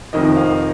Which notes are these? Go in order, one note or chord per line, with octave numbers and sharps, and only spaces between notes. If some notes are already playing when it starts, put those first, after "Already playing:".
F1 F2 D#3 D#5
F5